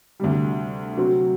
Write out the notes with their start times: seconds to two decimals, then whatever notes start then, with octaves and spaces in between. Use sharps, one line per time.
0.20 D2 C3 G3
0.97 C3 F#3 C4 F#4